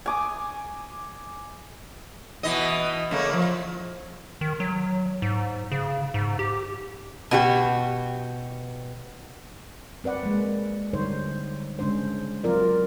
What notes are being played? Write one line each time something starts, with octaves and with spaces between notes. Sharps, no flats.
G#5 D6 D#6
B2 E3 D#5
C#3 A3 A#3
F3
D#3
F#3
G#2
C#3
G#2
G4
B2 F#4 G4
C4 B4 D5 F#5
G#3 A#3
D3 G3 D#4 C5 C#5
C#3 G#3 C#4 D4 C5
F#3 C4 F4 A#4 D5